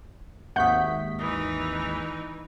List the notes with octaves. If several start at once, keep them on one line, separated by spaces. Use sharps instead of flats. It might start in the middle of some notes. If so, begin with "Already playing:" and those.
G#1 D#2 E5 F#5 C#6 D#6 G6 B6
E3 D#4 D#6